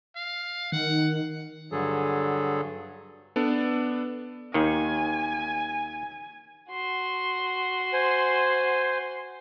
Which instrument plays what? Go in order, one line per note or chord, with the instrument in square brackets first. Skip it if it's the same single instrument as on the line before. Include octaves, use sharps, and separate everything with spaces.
[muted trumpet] F5
[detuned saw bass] D#3 [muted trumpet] F#5
[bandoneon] G2 D3 F#3 G#4 A4
[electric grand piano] B3 D4 A4 D5
[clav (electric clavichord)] D#2 D#3 [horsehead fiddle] G#5
[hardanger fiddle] F#4 C6
[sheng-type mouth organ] C5 G#5